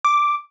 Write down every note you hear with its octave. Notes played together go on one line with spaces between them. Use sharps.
D6